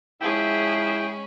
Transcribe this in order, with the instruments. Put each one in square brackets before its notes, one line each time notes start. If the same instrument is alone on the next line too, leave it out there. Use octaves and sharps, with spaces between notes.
[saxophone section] F3 E4 [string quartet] G#3 C#4 B5 [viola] G#4 [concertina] G5